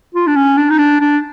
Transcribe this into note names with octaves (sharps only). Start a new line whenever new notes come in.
F4
D4
C#4
D4
D#4
D4
D4